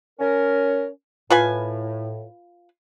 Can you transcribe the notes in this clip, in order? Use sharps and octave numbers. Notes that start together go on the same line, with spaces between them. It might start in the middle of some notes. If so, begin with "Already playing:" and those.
C#4 A#4
A2 F4 B4 G#5